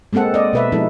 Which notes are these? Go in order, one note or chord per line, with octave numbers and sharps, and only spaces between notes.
G#3 A#3 C4 A4 F#5
D5 D#5
B2 B4 E5
F3 G#3 D#4 E4 A4